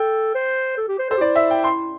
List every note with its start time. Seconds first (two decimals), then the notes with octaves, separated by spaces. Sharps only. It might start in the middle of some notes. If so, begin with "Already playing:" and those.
Already playing: A4 G5
0.35 C5
0.77 A4
0.88 G4
0.99 C5
1.10 A4 C5
1.17 G4
1.21 E4 D5
1.36 E5
1.51 G5
1.64 C6